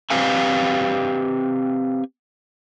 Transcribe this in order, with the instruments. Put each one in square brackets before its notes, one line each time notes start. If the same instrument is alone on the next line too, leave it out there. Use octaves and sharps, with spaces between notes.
[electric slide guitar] C4 G4 B4 F5 G#5